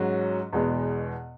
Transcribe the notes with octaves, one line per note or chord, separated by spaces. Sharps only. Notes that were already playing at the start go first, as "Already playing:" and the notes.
Already playing: G#2 F#3 C#4 F#4
E2 B2 G#3 B3